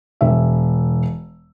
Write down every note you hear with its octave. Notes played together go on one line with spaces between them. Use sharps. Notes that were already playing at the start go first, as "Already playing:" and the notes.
E1 E5